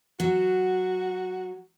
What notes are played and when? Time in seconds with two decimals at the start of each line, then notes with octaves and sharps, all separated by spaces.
0.20 F#3 F#4